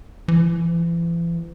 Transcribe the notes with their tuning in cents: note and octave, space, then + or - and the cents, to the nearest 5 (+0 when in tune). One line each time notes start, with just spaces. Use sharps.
E3 +40